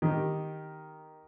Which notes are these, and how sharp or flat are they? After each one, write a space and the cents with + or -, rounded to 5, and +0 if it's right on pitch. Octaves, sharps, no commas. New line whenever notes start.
D#3 +0 G4 +0